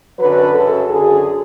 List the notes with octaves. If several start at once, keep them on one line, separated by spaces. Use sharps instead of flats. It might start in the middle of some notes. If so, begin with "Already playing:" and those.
F#2 D3 F#3 B4
F#2 C#3 F#3 A4
F#2 D3 F#3 G#4